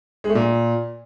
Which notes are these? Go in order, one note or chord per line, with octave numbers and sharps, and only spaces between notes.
G#3
A3
A#2